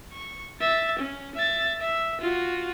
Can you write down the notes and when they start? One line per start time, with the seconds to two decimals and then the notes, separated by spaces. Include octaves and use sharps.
0.12 C#6
0.60 E5 A6
0.99 C#4
1.35 E5 A6
1.80 E5
2.21 F4 F#4